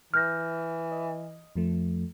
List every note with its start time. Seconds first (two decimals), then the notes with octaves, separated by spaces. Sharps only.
0.14 E3 F6 G6 A#6
0.92 D#5
1.56 F2 F3 A3